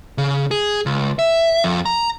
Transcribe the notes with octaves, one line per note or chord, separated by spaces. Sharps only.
C#3
G#4
C#2
E5
F2
A#5